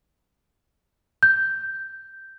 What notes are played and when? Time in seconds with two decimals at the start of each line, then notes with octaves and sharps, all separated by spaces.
1.23 G6